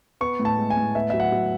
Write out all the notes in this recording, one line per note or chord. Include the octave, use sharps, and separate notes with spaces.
B3 C#6
A2
A5
G#3
G#5
A2
B3 E5
F#3 E5
F#5
F#3